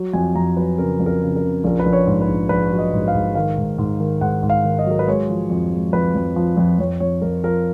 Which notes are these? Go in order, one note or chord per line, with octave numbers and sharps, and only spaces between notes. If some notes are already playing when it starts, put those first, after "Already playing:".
Already playing: F#3
F2 G#5
F2 A#5
F#3 B4
C#3 A#4
F2
A#4
C#3
A#4
C#3
A#1 A#4
B4
A#1
C#5
G#2
B4
A#1
A#1 B4
F#3
D#5
G#2
F5
G#2
D#3 F5
G#2
G#2
D#3
G#2 F#5
G#2
F5
D#3
D#5
F#3 A#4
B4
G#3 C#5
F3
F2
G#3
F2 B4
F2
F3
F2
F2 C#5
F2 C#5
F2 A#4
F3 A#4